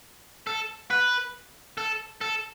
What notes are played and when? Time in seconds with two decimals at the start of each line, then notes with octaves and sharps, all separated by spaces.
0.47 A4
0.91 B4
1.78 A4
2.21 A4